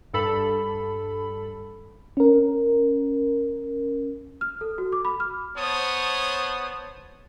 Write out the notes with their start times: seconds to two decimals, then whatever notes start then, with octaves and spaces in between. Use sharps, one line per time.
0.13 G2 A4 B5
2.17 C#4 A#4
4.41 F6
4.61 A4
4.78 F#4
4.92 D6
5.05 B5
5.20 F6
5.58 B3 C5 C#5 A5 D#6